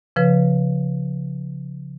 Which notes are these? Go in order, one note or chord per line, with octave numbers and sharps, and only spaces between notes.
C#3 F3 B4